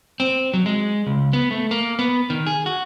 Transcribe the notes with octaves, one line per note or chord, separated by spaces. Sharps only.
C4
F#3
G#3
C#2
B3
A3
A#3
B3
D#3
G#4
F#4